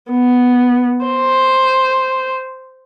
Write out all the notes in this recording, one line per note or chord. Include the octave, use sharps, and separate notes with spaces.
B3
C5